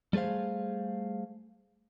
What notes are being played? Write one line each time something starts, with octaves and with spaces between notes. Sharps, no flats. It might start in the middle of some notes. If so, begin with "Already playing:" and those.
G3 A3 G#4 C5 F5